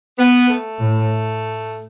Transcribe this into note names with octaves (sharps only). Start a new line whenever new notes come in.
B3
A3
A2